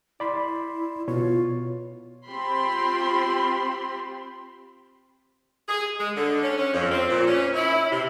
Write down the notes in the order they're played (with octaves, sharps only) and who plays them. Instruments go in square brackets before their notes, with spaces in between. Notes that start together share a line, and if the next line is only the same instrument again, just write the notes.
[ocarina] E4 [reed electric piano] D5 B5 C6
[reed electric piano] B2 C#5 [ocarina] F4
[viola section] C4 F4 G4 B5 C6
[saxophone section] G#4
G#3
D3
C#4
C#4
F2
C4
A#2
C#4
E4
C3